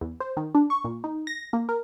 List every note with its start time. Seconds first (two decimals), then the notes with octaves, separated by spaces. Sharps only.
0.01 E2
0.20 C5
0.37 D#3
0.55 D4
0.70 C#6
0.85 A#2
1.04 D#4
1.27 A#6
1.53 A#3
1.69 A#4